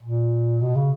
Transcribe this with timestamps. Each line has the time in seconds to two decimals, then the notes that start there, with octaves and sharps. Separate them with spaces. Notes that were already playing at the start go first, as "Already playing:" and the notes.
0.03 A#2
0.61 B2
0.76 C#3